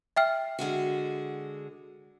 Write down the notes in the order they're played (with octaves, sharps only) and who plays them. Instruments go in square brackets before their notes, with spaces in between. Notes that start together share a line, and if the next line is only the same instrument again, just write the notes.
[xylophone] E5 G5 F6
[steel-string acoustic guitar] D3 G#3 F#4